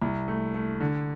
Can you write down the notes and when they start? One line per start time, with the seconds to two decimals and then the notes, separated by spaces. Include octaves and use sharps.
0.02 C2
0.28 A3
0.54 A3
0.80 D3